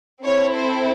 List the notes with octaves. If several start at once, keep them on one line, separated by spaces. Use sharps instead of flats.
C4 E4 A4 C#5
C5